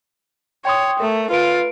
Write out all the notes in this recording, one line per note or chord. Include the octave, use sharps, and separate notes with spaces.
C#5 G5 C6 D#6
A3 A#4
F4 B4 D7